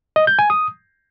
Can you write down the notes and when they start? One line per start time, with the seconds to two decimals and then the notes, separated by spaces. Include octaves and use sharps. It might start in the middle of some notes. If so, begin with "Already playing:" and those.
0.16 D#5
0.27 G6
0.39 G#5
0.50 D#6